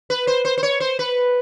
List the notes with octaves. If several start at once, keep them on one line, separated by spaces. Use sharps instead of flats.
B4
C5
C5
C5
C#5
C5
B4